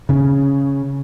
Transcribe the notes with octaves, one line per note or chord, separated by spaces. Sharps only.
C#3 C#4